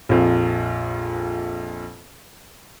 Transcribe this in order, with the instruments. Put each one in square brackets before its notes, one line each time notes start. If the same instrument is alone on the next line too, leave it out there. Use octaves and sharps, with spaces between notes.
[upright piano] A#1 F2